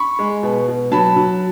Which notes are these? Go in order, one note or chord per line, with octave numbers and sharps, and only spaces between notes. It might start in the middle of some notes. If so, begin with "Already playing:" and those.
Already playing: B5 C#6
G#3
B2
B2
F#3 A5 B5
F#3